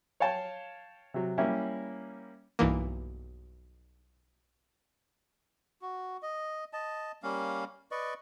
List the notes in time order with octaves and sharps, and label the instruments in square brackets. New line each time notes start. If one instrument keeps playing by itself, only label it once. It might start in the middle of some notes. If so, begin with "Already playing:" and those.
[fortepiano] C#5 F5 G5 A5
C3 F#3
G3 A#3 C#4 E4
[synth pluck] B1 G2 E3 A#3
[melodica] F#4
D#5
D#5 A5
G3 A#3 C#4 F5
B4 D5 D#5 C#6